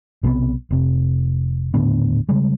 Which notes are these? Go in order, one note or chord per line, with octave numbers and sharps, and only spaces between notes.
B1 C3 F#3 B3
F1 C3
D#1 A2 D3 B3
C#3 G3 G#3